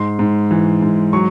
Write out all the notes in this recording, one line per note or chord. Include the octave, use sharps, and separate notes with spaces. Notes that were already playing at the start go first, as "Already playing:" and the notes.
Already playing: G#2 C6
G#2
E3
G#2
F#3 C#6